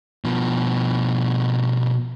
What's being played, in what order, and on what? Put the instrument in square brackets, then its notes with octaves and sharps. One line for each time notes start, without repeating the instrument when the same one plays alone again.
[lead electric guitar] B2 F3